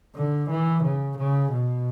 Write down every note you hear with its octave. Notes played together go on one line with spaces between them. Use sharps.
D3
E3
C#3
C#3
B2